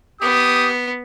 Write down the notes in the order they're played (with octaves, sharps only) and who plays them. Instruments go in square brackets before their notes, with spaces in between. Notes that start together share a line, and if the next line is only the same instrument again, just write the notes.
[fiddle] B3 [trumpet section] G4 D#6